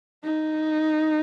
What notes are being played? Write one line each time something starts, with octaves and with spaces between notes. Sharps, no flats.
D#4